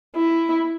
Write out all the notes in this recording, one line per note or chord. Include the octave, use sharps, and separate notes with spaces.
E4